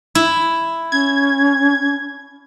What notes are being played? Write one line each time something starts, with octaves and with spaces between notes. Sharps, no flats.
E4
C#4 G#6